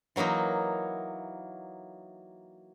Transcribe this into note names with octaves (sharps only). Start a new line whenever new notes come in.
E3 F#3 A#3 D#4 E4